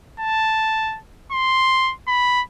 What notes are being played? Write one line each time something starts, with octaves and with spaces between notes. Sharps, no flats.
A5
C6
B5